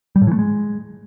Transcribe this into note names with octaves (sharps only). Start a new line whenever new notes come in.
G3
A2
E3
A3
G#3